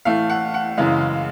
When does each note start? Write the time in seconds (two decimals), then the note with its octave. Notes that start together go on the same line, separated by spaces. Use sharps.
0.05 A2 E3 A3 F5
0.30 F#5
0.54 F#5
0.78 F#2 C#3 E3 G#3 F5